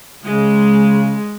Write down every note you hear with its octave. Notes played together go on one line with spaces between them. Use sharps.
C#3 G#3